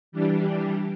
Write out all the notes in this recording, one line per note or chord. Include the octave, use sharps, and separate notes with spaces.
E3 G3 D4 G4